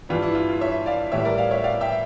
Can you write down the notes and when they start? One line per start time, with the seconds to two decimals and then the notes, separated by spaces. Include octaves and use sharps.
0.09 G2 E3 G3 F4
0.22 E4
0.35 F4
0.49 F4
0.61 C#5 E5
0.86 D5 F5
1.12 A2 E3 G3 C#5 E5
1.25 A#4 D5
1.38 D5 F5
1.51 C#5 E5
1.64 D5 F5
1.81 E5 G5